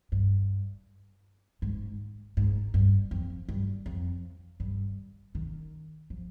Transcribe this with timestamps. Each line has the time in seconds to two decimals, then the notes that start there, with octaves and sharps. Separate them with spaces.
0.12 G2
1.62 G#2
2.37 G#2
2.74 G2
3.11 F2
3.49 G2
3.86 F2
4.60 G2
5.35 D#3
6.10 F3